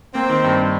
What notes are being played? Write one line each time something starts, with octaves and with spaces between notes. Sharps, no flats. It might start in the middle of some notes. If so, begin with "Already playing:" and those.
A#3 C4
D#3
G2